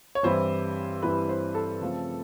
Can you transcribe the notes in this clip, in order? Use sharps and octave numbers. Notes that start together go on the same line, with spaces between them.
C#5
G2 E3 G3 C4 E4 C5
G2 E3 G3 C4 E4 B4
C5
A4
C#3 F3 A3 C4 F4